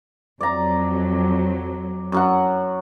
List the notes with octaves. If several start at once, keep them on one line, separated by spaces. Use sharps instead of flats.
F2 F#3 D5 A#5
F#2 F#3 F#5